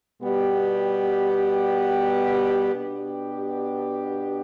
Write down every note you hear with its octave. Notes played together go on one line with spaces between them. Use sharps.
B2 G3 B3 G4
B2 B3 D4 G4